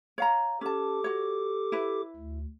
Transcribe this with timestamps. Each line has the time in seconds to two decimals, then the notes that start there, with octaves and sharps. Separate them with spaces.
0.18 C#5 F5 A#5
0.61 C#4 G4 A4 A5 D6
1.04 F#4 C#5
1.72 E4 B4
2.16 D2